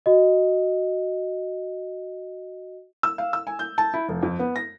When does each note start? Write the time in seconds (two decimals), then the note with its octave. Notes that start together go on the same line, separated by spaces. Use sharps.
0.06 F#4 D#5
3.03 E6
3.18 F5
3.33 E6
3.47 G#5
3.59 G6
3.78 A5
3.94 E4
4.09 F1
4.23 F2
4.39 B3
4.56 A#6